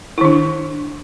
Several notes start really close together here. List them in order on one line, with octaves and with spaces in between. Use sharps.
E4 D#3 D4